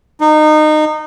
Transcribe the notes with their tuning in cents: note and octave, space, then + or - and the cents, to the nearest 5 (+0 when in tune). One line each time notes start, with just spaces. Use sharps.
D#4 -25